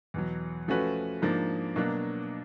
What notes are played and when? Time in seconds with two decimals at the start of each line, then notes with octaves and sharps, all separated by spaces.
0.14 E2 B2 F#3
0.68 F3 A3 C#4 F#4 B4
1.22 G#2 F3 A#3 D4
1.76 B2 F#3 A#3 D4